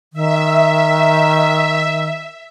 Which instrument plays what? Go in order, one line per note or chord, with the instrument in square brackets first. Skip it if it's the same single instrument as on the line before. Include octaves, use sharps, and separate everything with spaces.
[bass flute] D#3 [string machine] E5